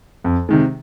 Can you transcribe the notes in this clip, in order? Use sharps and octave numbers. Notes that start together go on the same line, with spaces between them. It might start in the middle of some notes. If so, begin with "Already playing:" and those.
F2
C3 D#3 G#3